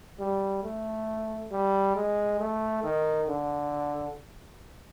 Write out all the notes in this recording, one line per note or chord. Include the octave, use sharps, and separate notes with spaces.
G3
A3
G3
G#3
A3
D#3
D3